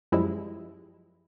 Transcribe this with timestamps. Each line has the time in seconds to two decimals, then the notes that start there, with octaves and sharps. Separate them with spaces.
0.12 F#2 F3 G3 G#3 E4